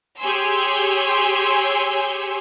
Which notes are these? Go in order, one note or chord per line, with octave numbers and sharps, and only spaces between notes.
G4 G#4 C#5 G#5 C6 E6